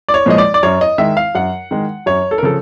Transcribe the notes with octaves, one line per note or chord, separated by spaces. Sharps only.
D5
C#5
A#2 F3 G#3 D#5
D5
D5
F#2 C#5
D#5
D#3 G#3 E5
F5
F#2 F#5
D#3 G#3
F#2 C#5
A4
A#4
C#3 F3 A4